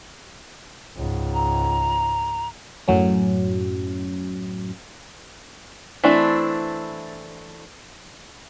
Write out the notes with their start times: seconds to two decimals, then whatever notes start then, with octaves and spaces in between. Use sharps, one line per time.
0.96 C#2 G#2
1.34 A#5
2.88 F#2 A2 F#3 C#4
6.03 E3 A3 C4 D4 E4